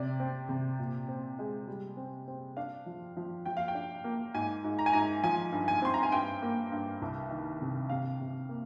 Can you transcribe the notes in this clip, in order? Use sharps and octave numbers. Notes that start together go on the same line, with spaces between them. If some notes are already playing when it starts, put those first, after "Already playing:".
Already playing: C3 D5
C4
C3
A#2
C4
G#3
G3
C4
C4
D4 F5
F3
F3
F3 G5
F5
G5
D4
A#3
G#2 G#5
G#2
A#5
G#5
G#2 A#5
F3 G#5
G2
G#5
C4 C6
A#5
G#5
G2 G5
A#3
G2
C2
D#3
C3
C3 F5
C3
A#3